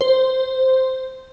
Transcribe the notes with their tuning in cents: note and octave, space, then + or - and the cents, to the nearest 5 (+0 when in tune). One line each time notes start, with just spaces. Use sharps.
C5 -5